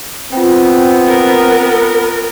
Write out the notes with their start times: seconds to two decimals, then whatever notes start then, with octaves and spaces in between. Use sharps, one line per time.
0.32 B3 C4 F4 G5
1.08 A#4